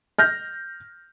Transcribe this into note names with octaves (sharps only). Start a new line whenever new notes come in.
F6 G6 A#6